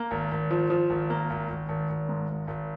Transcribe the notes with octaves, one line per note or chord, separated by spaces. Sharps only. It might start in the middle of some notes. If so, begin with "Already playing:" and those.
Already playing: A#3
G#1
G#1
F3
F3
G#1
A#3
G#1
G#1
G#1
G#1
G#2
G#1
G#1